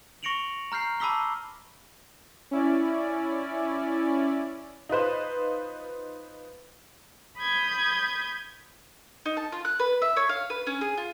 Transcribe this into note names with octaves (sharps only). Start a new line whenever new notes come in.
C#6 A#6 C#7 D7 F7 F#7
A#5 F6 G6 C7
A5 B5 D6 E6 B6 G7
C#4 E4 D5
D#4 F4 B4 C5
B5 D#6 G6 G#6
D#4
A5
F4
F#6
B4
E5
C#5
F5
B4
C#4
G#4
F4